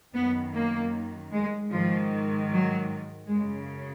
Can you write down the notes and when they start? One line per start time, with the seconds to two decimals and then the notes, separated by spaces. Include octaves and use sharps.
0.14 F#2 D#3 B3
0.53 A#3
1.33 G#3
1.71 G#2 D#3 F3
2.49 F#3
3.28 F#2 C#3 G#3